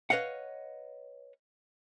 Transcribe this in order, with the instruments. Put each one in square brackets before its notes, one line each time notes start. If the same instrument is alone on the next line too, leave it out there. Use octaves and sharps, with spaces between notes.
[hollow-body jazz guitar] B4 C#5 D#5 F5 F#5